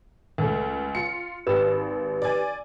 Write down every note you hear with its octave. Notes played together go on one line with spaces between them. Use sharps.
C#2 A3
F4 C#7
G#1 G4 B4 E6 E7
D5 G#5